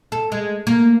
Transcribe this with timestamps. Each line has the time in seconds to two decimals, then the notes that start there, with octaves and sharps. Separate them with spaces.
0.12 A4
0.32 G#3
0.67 A#3